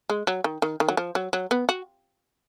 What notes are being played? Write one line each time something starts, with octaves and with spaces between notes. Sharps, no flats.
G#3
F#3
D#3
D#3
D#3
F#3
F3
F#3
F#3
B3
F#4